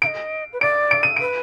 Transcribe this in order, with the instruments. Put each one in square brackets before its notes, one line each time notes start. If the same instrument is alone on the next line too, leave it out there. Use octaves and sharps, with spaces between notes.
[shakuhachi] F5 [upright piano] D7
[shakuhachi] D#5
B4
[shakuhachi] D5 [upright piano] D7
[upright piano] D7
D#7
[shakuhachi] B4 [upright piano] D7